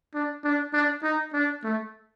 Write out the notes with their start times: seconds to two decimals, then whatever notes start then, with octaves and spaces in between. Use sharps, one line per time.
0.14 D4
0.44 D4
0.73 D4
1.03 D#4
1.34 D4
1.63 A3